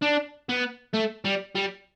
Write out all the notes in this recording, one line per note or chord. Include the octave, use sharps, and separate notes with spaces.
D4
B3
A3
G3
G3